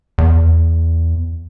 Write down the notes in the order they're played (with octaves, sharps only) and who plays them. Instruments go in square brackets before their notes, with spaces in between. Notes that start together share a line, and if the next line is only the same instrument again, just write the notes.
[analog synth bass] E2